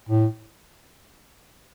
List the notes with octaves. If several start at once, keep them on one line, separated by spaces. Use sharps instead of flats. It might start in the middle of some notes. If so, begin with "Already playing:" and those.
A2